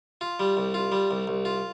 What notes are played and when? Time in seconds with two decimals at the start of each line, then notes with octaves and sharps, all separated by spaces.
0.21 F4
0.40 G3
0.57 C2
0.74 F4
0.92 G3
1.11 C2
1.27 C2
1.45 F4